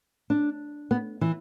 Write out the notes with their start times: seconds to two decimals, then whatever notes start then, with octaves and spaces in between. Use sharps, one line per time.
0.30 D4
0.91 B3
1.21 E3